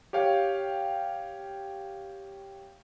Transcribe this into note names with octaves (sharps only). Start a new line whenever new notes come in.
G4 C#5 F5 G5